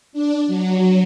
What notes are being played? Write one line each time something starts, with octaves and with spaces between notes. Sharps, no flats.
D4
F#3